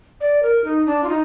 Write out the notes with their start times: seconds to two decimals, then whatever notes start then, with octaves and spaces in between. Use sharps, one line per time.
0.21 D5
0.43 A#4
0.64 D#4
0.86 D4
1.04 F4
1.09 D#4